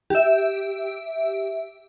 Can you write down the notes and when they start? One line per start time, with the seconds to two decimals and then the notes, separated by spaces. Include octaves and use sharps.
0.10 G4 E5